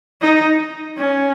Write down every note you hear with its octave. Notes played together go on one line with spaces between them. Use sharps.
D#4
C#4